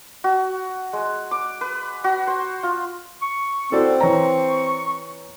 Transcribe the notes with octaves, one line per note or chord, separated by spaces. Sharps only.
F#4
G#3
D6
B4
F#4
C5
F4
C#6
C4 E4 F#4 A4 D5
E3 C#5 A#5 C#6